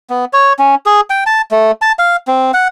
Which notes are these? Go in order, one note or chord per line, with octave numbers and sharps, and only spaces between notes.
B3
C#5
C#4
G#4
G5
A5
A3
A5
F5
C4
F#5